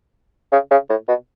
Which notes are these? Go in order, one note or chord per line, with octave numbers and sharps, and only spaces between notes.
C#3
C#3
A2
B2